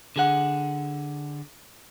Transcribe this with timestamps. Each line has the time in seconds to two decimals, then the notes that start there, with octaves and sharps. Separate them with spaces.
0.16 D3 G#4 F#5